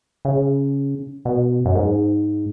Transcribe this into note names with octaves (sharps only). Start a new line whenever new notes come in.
C#3
B2
F#2
G#2